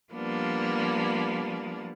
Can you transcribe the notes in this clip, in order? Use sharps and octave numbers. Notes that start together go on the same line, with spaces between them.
F3 G3 A#3 B3 D4